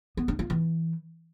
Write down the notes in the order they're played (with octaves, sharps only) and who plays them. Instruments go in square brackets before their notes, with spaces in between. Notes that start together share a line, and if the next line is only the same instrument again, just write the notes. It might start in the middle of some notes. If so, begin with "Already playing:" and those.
[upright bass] B3
D4
F4
E3